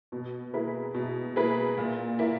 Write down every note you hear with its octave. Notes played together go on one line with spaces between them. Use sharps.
B2
A#3 E4 G#4 B4
B2
A#3 E4 G#4 B4
A#2
A#3 E4